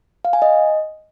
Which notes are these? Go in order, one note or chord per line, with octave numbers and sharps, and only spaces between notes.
F5
G#5
D#5